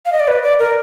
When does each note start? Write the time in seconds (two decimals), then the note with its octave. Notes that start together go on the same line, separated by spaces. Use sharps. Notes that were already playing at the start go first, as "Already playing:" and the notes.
0.06 F5
0.12 D#5
0.20 D5
0.28 B4
0.43 D5
0.59 A#4